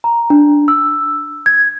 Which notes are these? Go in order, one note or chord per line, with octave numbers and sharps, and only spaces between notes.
A#5
D4
E6
G#6